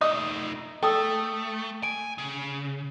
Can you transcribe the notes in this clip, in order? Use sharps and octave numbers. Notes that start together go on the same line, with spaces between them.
A3 D#4 D#5
A3 A4 G5 D#6 E6
G#5 D7
C#3